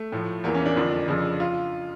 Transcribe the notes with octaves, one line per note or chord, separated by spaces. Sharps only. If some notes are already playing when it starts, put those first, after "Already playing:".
Already playing: A3
A2 F3
E2 E3 A#3
C#4
D4
F2 D3 F3
F2 C#3 F3
F4